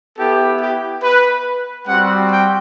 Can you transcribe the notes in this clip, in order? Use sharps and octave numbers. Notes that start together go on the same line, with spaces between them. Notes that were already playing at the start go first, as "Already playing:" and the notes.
B3 E4 G4 A4
G4
B4
G3 C4 F#4 F#5
G5